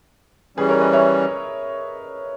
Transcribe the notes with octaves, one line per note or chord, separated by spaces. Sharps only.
E3 G3 C#4 G#4 B4
A#4 C#5
B4 D#5
C#5 E5